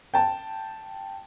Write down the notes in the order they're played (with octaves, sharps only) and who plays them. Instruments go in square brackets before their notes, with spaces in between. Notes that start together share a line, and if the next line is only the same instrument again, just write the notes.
[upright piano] G5 A5